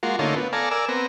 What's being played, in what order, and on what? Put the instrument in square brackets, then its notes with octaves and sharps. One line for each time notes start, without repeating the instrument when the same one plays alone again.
[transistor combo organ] G#3 A#3 F4 F#4
D3 A3 A#3 C#4 D#4 F4
B3
A4 D5 F5 G#5 A#5
A#4 D5 G#5 E6
B3 C4 A#5